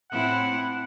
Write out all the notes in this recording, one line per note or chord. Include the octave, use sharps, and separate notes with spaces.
A2 C4 E4 F#5